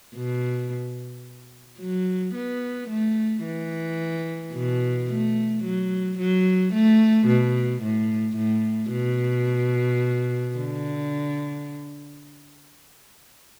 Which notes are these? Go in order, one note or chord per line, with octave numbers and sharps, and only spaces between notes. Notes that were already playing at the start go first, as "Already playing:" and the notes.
B2
F#3
B3
A3
E3
B2
A3
F#3
F#3
A3
B2
A2
A2
B2
D3